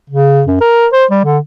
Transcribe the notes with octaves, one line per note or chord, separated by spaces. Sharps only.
C#3
F#2
A#4
C5
G3
D3